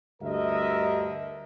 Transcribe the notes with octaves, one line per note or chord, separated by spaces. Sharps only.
D2 G2 D3 A#4 D#5 E5